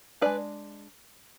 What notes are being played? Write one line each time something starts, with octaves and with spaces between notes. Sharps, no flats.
G#3 B3 D4 B4 D5